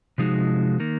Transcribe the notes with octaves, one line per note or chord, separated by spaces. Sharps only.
C3 F3 G#3 D#4 F#4
D#3 A#3